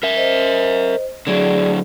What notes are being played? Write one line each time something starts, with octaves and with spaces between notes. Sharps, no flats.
A#4 E5
C5 D#5
D3 F#3 G#4 D5